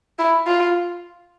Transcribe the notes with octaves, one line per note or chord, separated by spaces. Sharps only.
E4
F4